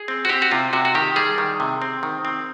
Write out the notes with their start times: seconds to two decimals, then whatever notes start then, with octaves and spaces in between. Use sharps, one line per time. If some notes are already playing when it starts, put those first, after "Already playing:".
Already playing: G#4
0.08 C4
0.25 F#4
0.29 C4 G4
0.42 F#4
0.51 C3 F4
0.73 C3 F#4
0.85 F#4
0.95 D#3 G4
1.16 G3 G#4
1.38 D#3
1.60 C3
1.82 C4
2.03 D#3
2.25 C4